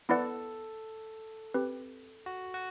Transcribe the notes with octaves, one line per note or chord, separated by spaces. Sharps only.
B3 E4 A4 B4 D5 F#5
C4 G4 B4
F#4
F#4